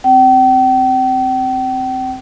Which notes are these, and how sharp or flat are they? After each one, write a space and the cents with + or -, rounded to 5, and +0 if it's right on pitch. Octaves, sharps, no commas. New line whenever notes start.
C4 +0 G5 -40